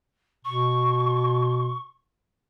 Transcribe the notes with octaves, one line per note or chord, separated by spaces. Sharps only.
B2 C#6